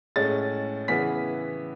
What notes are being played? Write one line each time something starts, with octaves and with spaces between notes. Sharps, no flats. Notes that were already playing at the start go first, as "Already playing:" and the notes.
A2 G#3 C#4 A6
C#3 E3 B3 B6